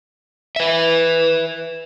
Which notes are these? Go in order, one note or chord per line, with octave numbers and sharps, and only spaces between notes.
B4 E5